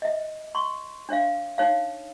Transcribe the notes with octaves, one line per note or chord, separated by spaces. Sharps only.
D#5 E5
C6 C#6
D4 C#5 E5 F5
D#4 C#5 F5